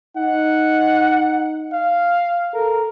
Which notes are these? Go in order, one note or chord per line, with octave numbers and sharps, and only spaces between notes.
D#4 F#5
F5
A4 A#4